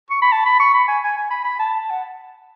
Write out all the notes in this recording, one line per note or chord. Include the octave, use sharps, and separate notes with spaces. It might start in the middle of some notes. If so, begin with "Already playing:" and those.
C#6
B5
A5
B5
C#6
B5
G#5
G#5
G#5
B5
B5
A5
F#5